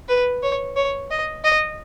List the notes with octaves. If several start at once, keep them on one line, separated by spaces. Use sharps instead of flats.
B4
C#5
C#5
D#5
D#5